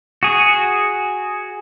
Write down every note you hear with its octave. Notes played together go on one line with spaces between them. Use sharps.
F#4 G#4